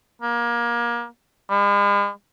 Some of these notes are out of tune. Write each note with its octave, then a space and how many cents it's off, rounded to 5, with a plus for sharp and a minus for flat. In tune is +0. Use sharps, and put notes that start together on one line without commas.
A#3 +25
G#3 -45